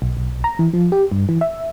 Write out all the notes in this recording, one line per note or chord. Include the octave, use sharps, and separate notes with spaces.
B1
B1
A#5
E3
F3
G4
G2
E3
E5